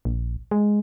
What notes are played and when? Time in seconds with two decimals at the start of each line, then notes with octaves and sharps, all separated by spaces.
0.05 A#1
0.51 G#3